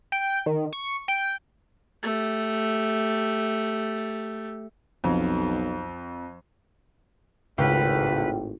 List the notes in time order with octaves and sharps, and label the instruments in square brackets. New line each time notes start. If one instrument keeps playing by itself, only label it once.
[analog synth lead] G5
D#3
C#6
G5
[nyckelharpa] A3 G4
[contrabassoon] B1 [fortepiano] F2
[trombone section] G#1 A2 [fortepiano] C#2 [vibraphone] F4 F#5 G5 [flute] B4